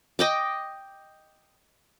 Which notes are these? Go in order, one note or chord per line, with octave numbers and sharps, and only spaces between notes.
D#5 G5 D6